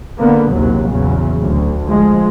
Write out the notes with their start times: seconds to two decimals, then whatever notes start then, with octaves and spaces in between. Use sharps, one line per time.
0.19 D3 A#3 B3
0.52 A#1 D#2 C3 F#3
0.88 E2 C#3 F#3
1.40 D2
1.88 F3 G#3